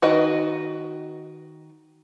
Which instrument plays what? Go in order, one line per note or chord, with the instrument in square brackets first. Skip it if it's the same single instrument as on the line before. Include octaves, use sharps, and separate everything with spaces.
[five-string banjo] D#3 F#4 B4 D#5